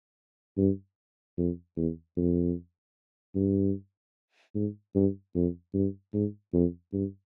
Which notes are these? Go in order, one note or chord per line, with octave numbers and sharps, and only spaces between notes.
G2
F2
E2
F2
G2
G#2
G2
F2
G2
G#2
F2
G2